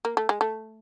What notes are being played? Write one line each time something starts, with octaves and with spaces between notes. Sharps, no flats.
A#3
A3
G#3
A3